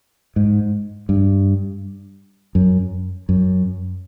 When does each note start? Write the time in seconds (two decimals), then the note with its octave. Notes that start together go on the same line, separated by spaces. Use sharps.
0.36 G#2
1.09 G2
2.55 F#2
3.29 F#2